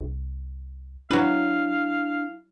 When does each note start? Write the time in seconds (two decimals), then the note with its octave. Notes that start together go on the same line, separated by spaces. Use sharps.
0.01 C2
1.11 F#3 D4 E4 B4 F5